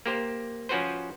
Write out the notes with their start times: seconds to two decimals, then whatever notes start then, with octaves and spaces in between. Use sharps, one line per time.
0.06 A#3 G4 C5
0.69 F3 C#4 F#4 B4 C5